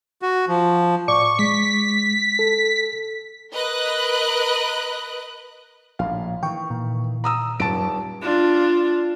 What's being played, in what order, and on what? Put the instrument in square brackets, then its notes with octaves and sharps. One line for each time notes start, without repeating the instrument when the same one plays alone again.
[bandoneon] F#4
F3
[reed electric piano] A2 D5 D6 [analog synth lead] C#6
[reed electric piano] G#3 [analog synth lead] B6
[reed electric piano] A4
[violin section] A#4 B4 D#5 F#6
[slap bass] A#1 A2 [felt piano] F5
[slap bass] D#3 E3 [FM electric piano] G5 C#6
[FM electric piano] A#2
[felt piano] A#5 D#6 E6
[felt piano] D#1 A5 D7 [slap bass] F#2
[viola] D4 F4